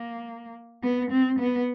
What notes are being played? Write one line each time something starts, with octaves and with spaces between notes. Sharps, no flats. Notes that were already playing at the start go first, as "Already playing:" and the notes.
Already playing: A#3
B3
C4
B3